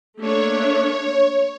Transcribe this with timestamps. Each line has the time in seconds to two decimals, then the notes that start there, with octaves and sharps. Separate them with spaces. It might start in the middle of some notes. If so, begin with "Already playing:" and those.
0.21 A3 A#3 D4 C#5